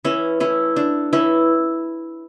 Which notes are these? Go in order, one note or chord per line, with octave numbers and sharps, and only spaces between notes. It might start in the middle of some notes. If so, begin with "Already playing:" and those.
E3 C#4 E4
A3 C#4 E4
A3 D4
E3 C#4 E4